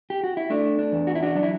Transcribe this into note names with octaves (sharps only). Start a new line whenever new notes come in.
G4
F#4
E4
A3 D4
D4
E2
F#4
E4
D4 F#4
F#3 D4
E4